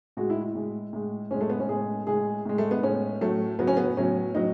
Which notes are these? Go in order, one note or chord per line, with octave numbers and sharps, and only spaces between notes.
A2 G#3 F#4
E4
A2 G#3
A2 G#3
A2 G#3 C#4
A3
B3
C#4
A2 G#3 G#4
A2 G#3 G#4
A2 G#3
A3
B3
A2 G#3 C#4
A2 F#3 A3
A2 F#3 B3
C#4
B3
A2 F#3 C#4
A2 F#3 D#4